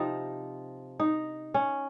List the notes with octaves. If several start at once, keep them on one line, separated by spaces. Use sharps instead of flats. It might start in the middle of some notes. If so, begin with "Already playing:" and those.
Already playing: C3 F3 C4 D#4
D#4
C#4